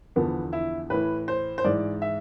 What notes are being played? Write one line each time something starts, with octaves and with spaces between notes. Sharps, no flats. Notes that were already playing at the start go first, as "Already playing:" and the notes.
E2 D3 F3 B3
E4
A2 E3 B4
C5
C5
G#2 E3 D5
E5